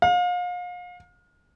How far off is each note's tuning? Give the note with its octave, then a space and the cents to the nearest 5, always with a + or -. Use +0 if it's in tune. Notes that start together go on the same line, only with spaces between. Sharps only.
F5 +35